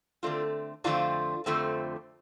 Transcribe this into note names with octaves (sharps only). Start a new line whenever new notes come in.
D3 A3 C4 D4 F4
F2 D3 F3 A3 C4 D4 F4
F2 D3 F3 A3 C4